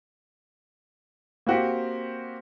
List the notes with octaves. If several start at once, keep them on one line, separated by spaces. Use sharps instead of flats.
A#3 C4 F#4 G4